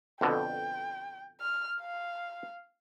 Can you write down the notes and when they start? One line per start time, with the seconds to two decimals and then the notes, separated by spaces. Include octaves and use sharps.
0.21 F2 B2 D3 G5
1.41 F6
1.80 F5